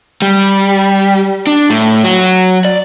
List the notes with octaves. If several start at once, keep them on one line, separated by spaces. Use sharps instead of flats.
G3
D4
A2
F#3
D5